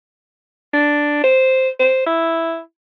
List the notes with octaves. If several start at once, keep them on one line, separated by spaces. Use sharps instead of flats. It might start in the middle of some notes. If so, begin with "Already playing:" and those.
D4
C5
C5
E4